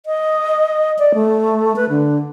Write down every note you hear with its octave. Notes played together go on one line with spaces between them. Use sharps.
D#5
D5
A3
B4
D3